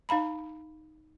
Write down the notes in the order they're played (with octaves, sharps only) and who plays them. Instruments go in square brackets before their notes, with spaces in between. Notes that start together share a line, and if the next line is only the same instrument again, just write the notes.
[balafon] D#4 F5 A#5 B5